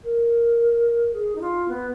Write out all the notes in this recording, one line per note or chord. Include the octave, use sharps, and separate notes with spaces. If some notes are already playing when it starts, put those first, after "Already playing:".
A#4
G#4
D#4
F4
B3